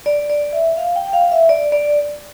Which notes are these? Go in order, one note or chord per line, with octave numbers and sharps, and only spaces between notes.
D5
D5
E5
F5
G5
G5
F5
E5
D5
D5